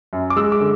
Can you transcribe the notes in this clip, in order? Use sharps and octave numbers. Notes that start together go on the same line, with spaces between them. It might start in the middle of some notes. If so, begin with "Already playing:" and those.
F#2
D6
G#3 E6
D6
D3